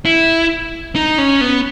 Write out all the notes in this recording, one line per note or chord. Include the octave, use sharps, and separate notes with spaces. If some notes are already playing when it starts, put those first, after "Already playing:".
E4
D#4
C#4
B3